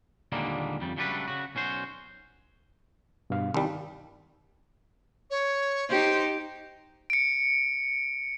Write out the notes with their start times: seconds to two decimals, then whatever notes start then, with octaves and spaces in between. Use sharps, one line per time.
0.32 D#2 A#2 D3 G3 G#3 A#3
0.81 F2 C#3 G3
0.97 C#3 F#3 G3 A3 D4 B4
1.28 C#3 F#4
1.55 B1 C#4 F#4 C5
3.30 G2 B2 F5
3.54 C2 D#3 G3
5.30 C#5
5.89 D#4 G4 C5
7.10 C#7 D7